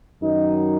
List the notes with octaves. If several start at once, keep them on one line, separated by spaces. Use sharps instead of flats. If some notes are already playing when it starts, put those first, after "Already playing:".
F#2 D#3 F#3 D#4